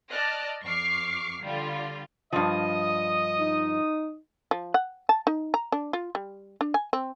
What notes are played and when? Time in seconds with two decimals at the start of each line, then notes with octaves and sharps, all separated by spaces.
0.11 D5 D#5 A5 F6 F#6
0.62 F2 C#6 D6 F6 C7
1.43 D3 G3 F4
2.33 G2 F3 D#5 D#6
3.39 D#4
4.51 F3
4.74 F#5
5.09 A5
5.27 D#4
5.54 A#5
5.72 D4
5.93 F4
6.15 G3
6.61 D4
6.74 G#5
6.93 C4